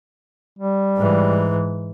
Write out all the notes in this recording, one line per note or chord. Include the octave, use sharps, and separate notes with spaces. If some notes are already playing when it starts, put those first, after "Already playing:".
G3
G#2 E3